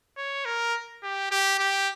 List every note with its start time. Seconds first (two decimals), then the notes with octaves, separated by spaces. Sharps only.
0.18 C#5
0.45 A#4
1.03 G4
1.31 G4
1.59 G4